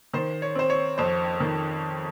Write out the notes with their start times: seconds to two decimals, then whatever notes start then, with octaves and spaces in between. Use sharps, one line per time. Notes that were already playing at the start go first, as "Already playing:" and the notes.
0.13 D#3 C5
0.42 C#5
0.55 C4 C5
0.70 C#5
0.98 F2 C5
1.40 D#3